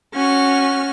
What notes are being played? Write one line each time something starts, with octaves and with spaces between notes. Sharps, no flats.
C#4 F#4 F6